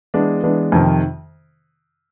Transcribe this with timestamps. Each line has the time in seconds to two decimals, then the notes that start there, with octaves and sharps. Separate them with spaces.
0.14 E3 G#3 B3 D4
0.44 E3 G#3 B3 D4
0.72 F2 C3 D#3